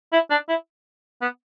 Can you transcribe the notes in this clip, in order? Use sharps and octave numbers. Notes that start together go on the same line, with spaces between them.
E4
D4
E4
B3